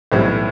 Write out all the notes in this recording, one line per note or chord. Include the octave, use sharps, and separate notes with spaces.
B1 A2 E3 G3 C4